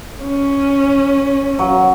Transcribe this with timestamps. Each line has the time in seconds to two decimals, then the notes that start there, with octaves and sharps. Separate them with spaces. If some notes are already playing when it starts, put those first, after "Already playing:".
0.24 C#4
1.59 F#3